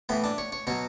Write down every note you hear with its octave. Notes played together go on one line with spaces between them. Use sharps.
A2 E3 B3
D4
C#5
C#5
B2 F#3 C#5